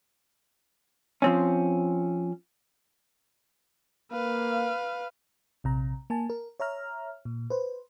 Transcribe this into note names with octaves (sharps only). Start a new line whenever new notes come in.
F3 C4 C#4
A#3 B4 F5
A#1 C3 A#5
A#3 G#5 A5
A#4
C#5 E5 A#5 F6
A#2
B4 C5